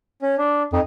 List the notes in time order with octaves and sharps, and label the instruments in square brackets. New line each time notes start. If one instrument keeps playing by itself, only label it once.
[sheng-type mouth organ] C#4
D4
[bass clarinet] F2 [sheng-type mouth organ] D#4